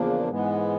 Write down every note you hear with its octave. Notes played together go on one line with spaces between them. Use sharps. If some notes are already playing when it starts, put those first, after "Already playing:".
Already playing: E2 C#3 F3 A#3 D4
G#2 E3 G#3 B3